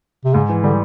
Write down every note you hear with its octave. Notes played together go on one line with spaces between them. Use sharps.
C3
G#2 C#3
E3
D3 G3